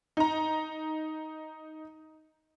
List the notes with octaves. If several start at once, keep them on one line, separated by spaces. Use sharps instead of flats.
D#4 A#5